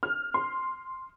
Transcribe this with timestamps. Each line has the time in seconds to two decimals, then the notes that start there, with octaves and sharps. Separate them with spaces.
0.03 F6
0.34 C6